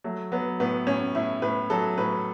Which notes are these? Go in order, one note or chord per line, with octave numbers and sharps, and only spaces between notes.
F#3 A3
F#3 B3
A2 B3
A2 C#4
A2 E4
A2 B4
F#3 A4
A2 B4